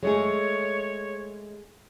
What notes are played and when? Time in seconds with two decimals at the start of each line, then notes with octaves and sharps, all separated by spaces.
0.03 G#3 A3 G#4 C#5